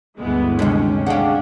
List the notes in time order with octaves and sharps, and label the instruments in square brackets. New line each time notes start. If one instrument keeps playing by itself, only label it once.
[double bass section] G1 D2 A3 [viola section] E3 G#3 B3
[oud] D#2 C3 [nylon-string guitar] G#3 D4 [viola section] C#4
[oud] G#3 G4 [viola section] C#4 D4 [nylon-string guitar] F5 F#5